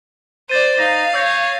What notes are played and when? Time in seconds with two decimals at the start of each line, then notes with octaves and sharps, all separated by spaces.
0.49 C5 D5 A6 D#7
0.79 D#4 F5 A#6
1.14 C#5 E6 G6 A#6